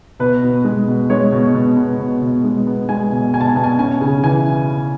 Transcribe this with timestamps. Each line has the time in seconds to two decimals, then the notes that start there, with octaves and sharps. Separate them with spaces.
0.19 B2 B4
0.43 B2
0.65 G#3
0.88 B2
1.10 G#3 C#5
1.32 B2
1.54 B2
1.76 B3
2.00 B2
2.22 B2
2.44 G#3
2.67 B3
2.89 G#3 G#5
3.12 B2
3.34 B2 G#5
3.41 A5
3.49 G#5
3.56 B2 A5
3.64 G#5
3.79 C#4 G#5
4.01 C#3
4.23 E3 G#5